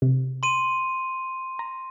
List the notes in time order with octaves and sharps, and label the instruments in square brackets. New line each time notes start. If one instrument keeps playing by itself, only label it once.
[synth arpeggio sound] C3
[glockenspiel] C6 D#7
[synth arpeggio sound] A#5